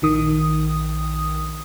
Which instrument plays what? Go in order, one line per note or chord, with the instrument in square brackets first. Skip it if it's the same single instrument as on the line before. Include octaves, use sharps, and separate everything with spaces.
[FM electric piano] A#1 D#3 D#6